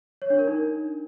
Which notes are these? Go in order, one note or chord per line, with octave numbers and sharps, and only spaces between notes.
C#5
D4
A#4
D#4